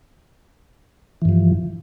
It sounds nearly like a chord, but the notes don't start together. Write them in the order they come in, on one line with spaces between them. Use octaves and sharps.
E3 G2 F3